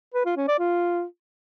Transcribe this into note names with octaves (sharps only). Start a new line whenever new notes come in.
B4
F4
C#4
D5
F4